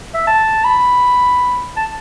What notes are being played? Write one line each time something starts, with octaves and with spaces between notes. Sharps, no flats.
E5
A5
B5
A5